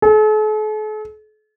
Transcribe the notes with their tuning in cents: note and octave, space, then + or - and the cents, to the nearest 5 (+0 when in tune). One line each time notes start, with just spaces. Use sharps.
A4 -45